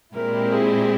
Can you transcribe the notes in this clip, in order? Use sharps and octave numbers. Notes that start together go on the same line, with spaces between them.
A#2 G#3 C4 E4 G4 A#4
G#4